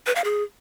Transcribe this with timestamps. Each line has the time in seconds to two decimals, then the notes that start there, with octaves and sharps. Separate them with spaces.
0.06 B4
0.15 F5
0.24 G#4